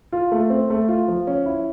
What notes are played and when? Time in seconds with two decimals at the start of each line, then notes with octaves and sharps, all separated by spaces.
0.12 F4
0.32 A3
0.50 C4
0.70 A3
0.89 F4
1.08 F3
1.27 C#4
1.46 E4